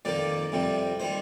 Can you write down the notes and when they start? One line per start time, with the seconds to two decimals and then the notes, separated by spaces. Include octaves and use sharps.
0.05 F2 D#3 A#3 D5
0.52 F2 C3 G3
1.00 D#3 G3 C5